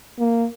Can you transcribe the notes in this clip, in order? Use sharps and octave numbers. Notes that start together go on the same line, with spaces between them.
A#3